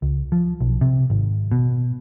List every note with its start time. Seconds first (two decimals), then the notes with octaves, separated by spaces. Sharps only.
0.02 C#2
0.32 F3
0.61 B1
0.81 C3
1.10 G#1
1.52 B2